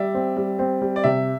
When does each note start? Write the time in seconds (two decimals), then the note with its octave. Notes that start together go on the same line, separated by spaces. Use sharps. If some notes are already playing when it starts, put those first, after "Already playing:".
Already playing: G3 D5 E5
0.15 C4
0.37 G3
0.59 C4
0.81 G3
0.96 D5
1.04 C3 E5